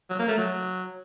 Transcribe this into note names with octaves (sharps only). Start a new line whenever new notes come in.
F#3
A#3
A3
F#3